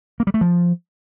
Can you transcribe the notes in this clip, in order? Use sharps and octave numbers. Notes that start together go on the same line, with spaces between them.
A#3
G3
A3
F3